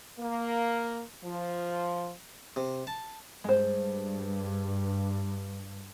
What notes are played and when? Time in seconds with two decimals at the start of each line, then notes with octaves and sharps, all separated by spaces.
0.18 A#3
1.23 F3
2.56 C3
2.87 A5
3.44 G2 G#3 C5